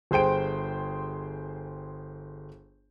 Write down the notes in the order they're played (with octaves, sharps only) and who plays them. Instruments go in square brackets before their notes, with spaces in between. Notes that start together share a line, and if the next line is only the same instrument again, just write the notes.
[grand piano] G1 G#4 C5 G5 D7